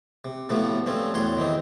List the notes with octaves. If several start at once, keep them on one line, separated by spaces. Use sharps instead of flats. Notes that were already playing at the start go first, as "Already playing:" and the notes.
C3
A2 C3 F3 F#3 A3 B3
G2 F3 A3 C4 C#4
E2 A2 F#3 C#5 C6
D#3 E3 C4 D#4